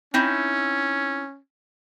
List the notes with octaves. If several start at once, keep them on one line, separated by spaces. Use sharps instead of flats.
C4 C#4 D#4 E4